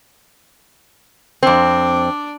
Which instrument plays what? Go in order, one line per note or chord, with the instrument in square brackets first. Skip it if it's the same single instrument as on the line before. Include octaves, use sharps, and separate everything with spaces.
[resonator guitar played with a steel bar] F2 C4 [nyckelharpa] D4 D5